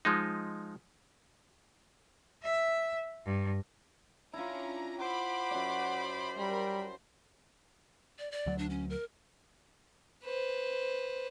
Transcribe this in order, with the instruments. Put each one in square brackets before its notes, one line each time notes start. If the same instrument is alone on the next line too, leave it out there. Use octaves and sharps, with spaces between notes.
[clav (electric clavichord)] F3 G#3 D#4
[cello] E5
G2
[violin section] C#4 D4 A#5 [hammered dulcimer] E4 F4
[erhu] C5 [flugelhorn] F#5 [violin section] B5 D6
[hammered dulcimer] F#2 D5
[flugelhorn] G3 [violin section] A#4 B5
[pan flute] D5
D5
[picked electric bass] D2 F#3
[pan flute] D4
C#4
A#4
[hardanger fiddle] B4 C5